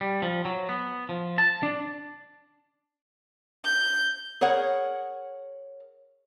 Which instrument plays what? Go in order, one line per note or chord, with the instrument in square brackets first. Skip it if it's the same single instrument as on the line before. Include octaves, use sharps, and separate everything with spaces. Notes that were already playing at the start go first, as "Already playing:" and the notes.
[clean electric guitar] G3
F3
F#3
B3
F3
A5
D4
[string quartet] G6
[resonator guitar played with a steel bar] G#4 A#4 C#5 F#5